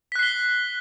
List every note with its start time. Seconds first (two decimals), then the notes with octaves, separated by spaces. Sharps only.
0.12 B6
0.16 F#6
0.19 C7
0.23 G7